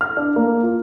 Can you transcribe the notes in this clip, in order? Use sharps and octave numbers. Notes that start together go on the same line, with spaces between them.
F6
D4
A#3
F4